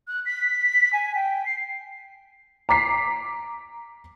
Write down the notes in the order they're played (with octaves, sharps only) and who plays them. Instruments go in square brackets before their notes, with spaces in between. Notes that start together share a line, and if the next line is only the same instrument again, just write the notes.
[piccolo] F#6
B6
G#5
G5
C7
[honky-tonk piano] A#5 D6 B6 C7